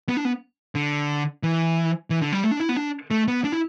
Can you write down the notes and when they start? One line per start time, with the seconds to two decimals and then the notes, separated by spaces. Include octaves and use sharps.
0.09 B3
0.17 D4
0.25 B3
0.75 D3
1.43 E3
2.10 E3
2.21 D3
2.32 G3
2.44 A3
2.51 D4
2.60 E4
2.69 B3
2.77 D4
3.11 A3
3.28 B3
3.45 D4
3.52 E4